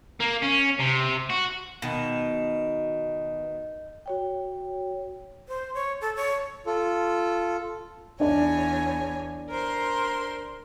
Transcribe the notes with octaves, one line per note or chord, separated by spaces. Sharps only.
A#3
C#4
C3
F#4
B2 D#3
F#4 C#5 G5
C5
C#5
A4
C#5
F4 A4
E2 D4 C#5 D5 G#5
A#4 C5 C6